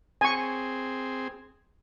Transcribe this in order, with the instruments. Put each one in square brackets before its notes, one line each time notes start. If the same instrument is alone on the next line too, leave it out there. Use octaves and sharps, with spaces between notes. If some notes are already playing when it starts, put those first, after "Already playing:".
[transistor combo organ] C4 G#4 [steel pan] G#5 C#6